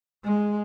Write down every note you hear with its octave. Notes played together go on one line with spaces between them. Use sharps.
G#3